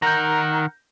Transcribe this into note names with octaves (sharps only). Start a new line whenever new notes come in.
D#3 A#4 F#5 G6 A#6